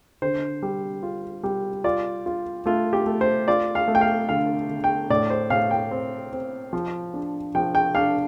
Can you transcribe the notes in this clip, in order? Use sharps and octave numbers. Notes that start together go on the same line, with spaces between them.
D3 C5
G3
F4
G3
F4 D5
F4
A3 F4
G4
A3
C5
F4 D5
F5
A3
G5
F5
D3 F5
D3
G5
A2 D5
C5
A2 F5
G5
C4
C4
F3
D4
F3 G5
G5
D4 F5